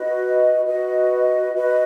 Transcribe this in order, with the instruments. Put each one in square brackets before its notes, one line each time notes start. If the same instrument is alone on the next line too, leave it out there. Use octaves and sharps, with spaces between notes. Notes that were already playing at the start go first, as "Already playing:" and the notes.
Already playing: [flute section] F#4 B4 D#5
F#4 B4 D#5
F#4 B4 D#5